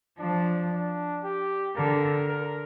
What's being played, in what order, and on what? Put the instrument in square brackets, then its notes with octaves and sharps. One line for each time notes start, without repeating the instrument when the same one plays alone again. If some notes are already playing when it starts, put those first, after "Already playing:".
[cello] F3 [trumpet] D4
[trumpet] D4
G4
[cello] D3 [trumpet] A#4
[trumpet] A#4